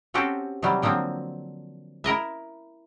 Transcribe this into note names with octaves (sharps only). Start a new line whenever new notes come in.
C4 C#4 F#4 G4 A4 C5
C3 D#3 F#3 G3
D3 F3 F#3 A#3 C4
E4 A#4 D#5 E5